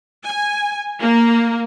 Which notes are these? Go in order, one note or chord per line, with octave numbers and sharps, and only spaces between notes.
G#5
A#3